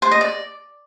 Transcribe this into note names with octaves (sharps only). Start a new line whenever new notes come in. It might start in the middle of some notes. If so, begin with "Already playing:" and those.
C5
D#5
D5